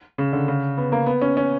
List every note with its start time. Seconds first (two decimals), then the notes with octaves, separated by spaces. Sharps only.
0.18 C#3
0.33 D3
0.48 C#3
0.78 B3
0.92 A#3
1.06 B3
1.21 C#4
1.37 C#4